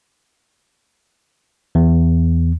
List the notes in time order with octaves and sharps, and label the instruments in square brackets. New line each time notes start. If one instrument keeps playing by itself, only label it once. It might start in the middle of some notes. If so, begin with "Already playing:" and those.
[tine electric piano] E2